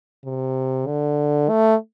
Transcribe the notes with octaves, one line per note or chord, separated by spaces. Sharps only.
C3
D3
A3